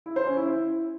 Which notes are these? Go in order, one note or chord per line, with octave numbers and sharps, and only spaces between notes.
E4
C5
C#4
E4
E4